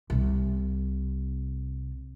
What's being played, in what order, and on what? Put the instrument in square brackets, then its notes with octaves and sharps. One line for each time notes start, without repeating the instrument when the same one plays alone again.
[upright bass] C2 C3